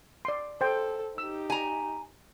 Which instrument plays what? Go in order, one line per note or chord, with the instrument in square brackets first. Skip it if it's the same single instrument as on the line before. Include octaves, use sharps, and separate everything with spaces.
[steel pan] D5 C6
[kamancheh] A4 [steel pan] C5 G5
[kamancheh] D#4 G4 [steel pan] E6
[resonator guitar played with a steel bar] G#5 A#5